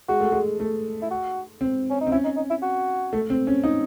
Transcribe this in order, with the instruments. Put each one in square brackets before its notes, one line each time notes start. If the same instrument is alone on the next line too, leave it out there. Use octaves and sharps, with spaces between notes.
[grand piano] G#3 [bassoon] F#4
[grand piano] A3
G#3
A3
[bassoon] E4
F#4
[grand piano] C4
[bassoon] C#4
D#4
[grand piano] C4
[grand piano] C#4 [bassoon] E4
[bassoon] D#4
D#4
E4
F#4
[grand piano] A3
C4
C#4
D#4